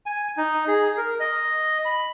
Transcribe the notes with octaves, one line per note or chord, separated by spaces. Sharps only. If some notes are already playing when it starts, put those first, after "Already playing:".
G#5
D#4
G#4
A#4
D#5
B5